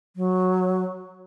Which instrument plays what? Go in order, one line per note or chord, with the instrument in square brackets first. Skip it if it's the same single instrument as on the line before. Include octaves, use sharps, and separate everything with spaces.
[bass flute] F#3